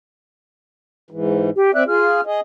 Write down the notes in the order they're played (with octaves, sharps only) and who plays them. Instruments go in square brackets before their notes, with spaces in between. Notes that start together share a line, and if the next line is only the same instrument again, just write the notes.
[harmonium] G#2 E3
[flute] G4
[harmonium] C4 D5 E5 [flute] F#6
[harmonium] F4 G#4 [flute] F6
[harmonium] G#4 D#5